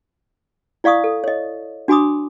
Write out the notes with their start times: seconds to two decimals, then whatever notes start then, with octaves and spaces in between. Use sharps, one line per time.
0.84 E4 D5 F5 C#6 D#6
1.04 A4
1.24 C#5 D#5
1.88 D4 F#4 G#5 B5 D6 D#6